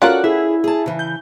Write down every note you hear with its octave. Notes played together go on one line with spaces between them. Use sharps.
C#4 F4 F#4 A4 A#4 D5 F#5
E4 G#4
G#4 A5
C#3 E3
G6